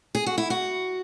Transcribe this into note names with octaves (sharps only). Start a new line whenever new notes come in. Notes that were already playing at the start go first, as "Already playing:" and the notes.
G#4
F#4
E4
F#4